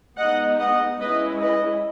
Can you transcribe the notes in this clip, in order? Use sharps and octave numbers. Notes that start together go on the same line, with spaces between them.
G#3 B3 D#4 D#5 F#5
D#5 F#5
G#3 C#4 E4 B4 D#5
B4 D#5